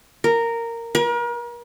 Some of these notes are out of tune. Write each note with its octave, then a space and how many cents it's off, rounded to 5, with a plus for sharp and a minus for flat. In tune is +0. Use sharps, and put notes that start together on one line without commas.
A#4 -10
A#4 +40